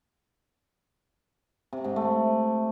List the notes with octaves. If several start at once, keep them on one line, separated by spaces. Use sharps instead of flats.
C3
G#2
A3